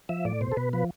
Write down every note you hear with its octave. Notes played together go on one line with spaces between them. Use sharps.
F3 E5
A2 D5
B2 C5
A4
B2 B4
F3 B4